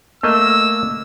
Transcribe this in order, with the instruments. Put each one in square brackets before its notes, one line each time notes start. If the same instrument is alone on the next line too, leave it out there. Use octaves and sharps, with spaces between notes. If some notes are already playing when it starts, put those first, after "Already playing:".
[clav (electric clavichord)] A3 A#3 D#5 [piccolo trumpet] E6